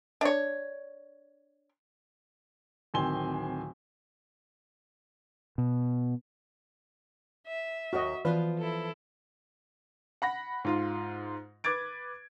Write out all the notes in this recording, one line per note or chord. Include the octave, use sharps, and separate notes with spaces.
D4 C#5
D1 D#3 C4 G#5 C6 G7
B2
E5
D#2 F#4 A#4 D#5
E3 F3 B3 F4 B4
E4 A4
F#5 B5 A#6
G#2 F4 C6
B4 D6 G#6 A6 D7